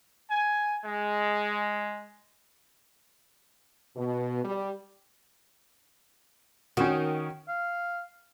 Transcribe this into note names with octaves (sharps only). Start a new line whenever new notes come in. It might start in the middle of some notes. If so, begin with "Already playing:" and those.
G#5
G#3
B2
G3
D#3 C#4 F#4
F5